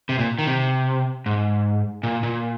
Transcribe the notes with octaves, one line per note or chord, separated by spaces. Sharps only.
C3
A#2
D#3
C3
G#2
A#2
A#2